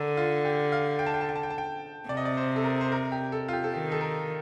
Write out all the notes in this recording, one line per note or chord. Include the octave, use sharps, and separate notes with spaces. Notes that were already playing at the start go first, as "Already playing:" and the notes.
Already playing: D3 A4 A#4
F4
G4
F5
G5
A5
G5
A5
G5
A5
G5
A5
G5
C3 D5
D#5
D5
C5
A4
A#4
C5
A#4
G4
A4
F4
G4
A4
D#3 G4
A4
A#4